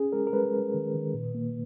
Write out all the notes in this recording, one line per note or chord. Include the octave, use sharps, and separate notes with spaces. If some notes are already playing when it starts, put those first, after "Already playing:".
Already playing: C#4 G#4
G#3 A#4
A#4
G#3 B4
G#3
D#3
D#3
A#2
A#3